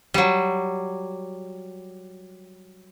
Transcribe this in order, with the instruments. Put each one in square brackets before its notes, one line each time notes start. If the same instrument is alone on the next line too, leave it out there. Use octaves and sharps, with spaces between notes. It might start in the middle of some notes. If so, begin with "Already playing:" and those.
[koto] F#3 G3